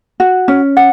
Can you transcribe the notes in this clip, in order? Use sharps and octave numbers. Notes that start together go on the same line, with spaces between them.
F#4
C#4
F#5